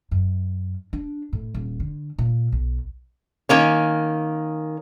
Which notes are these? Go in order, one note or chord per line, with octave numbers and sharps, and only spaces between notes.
F#2
D4
A2
D#1
D3
A#2
B1
D#3 A#3 C#4